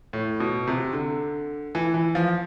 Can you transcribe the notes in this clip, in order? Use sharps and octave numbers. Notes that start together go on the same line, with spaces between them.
A2
B2
C3
D3
E3
E3
F3